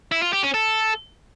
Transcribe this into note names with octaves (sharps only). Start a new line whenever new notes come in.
E4
F4
G4
C#4
A4